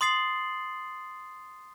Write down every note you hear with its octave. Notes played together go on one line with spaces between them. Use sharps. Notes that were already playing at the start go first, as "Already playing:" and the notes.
C6 D#6 A6 C7 F#7